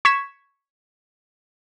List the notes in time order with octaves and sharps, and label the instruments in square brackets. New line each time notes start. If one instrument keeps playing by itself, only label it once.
[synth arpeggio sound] C#6 G#6 B6 E7